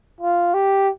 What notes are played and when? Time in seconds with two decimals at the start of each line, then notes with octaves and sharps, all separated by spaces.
0.21 F4
0.54 G4